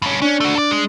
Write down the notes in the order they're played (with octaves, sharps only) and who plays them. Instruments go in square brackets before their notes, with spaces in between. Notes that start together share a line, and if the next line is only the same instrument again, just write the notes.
[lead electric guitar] G2 C#4
[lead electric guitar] C#4 [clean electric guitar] D4
[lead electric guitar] A3 F#4
A4 D5
G#3